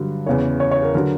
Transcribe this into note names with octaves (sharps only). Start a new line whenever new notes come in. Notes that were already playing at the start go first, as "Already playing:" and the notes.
Already playing: G2 D3 F#3
E2 C#3 E3 C#5
C#5
C#5
A#4
D3 F#3 A#4